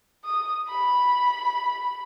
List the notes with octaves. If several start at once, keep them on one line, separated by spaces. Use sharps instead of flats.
D#6
B5